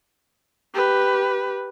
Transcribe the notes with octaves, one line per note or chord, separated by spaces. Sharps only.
G4 B4